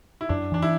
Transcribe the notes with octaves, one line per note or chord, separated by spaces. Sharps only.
E4
F#2 D4
E3 D4
E4